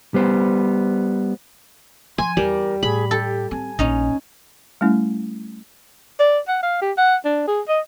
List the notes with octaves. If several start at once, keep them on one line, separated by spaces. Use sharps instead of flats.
G3 B3 C5
F3 G#5 C6
E2 G3 A#4
A2 G#4 B5
G4 A4
C4 G#5
A#1 C#4 D#4
G3 A3 C#4 E4
D5
F#5
F5
G4
F#5
D4
G#4
D#5